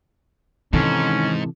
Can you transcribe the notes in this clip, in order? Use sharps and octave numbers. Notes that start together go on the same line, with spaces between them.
G#2 C3 D#3 E3 C#4 A4